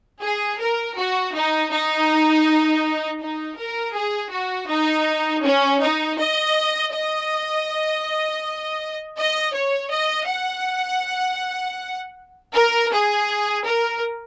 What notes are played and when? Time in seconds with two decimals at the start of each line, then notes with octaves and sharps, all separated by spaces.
0.21 G#4
0.59 A#4
0.96 F#4
1.33 D#4
1.71 D#4
3.21 D#4
3.57 A#4
3.95 G#4
4.32 F#4
4.69 D#4
5.44 C#4
5.81 D#4
6.18 D#5
6.93 D#5
9.18 D#5
9.55 C#5
9.92 D#5
10.29 F#5
12.53 A#4
12.91 G#4
13.65 A#4